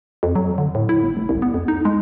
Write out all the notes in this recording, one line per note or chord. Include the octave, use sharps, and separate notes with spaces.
F2
F#3
D3
A2
E4
G1
F1
C2
B3
F2
D#4
G#3